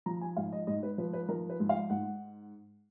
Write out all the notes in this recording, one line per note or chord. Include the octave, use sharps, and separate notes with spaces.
F3 A#5
G#5
G#2 F5
D#5
G#2 D#5
B4
F3 B4
B4
F3 A#4
B4
G#2
F5
G#2 F#5